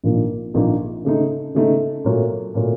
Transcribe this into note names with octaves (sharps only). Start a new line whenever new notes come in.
A#1 A#2 F3 A#3 D#4
A#1 A#2 F3 A#3 D#4
C#3 A3 D#4
C#3 A3 D#4
A#2 F#3 A3
A#2 F#3 A3